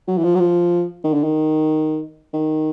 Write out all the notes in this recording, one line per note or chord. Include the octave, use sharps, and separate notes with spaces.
F#3
E3
F3
F#3
F3
D#3
D3
D#3
D#3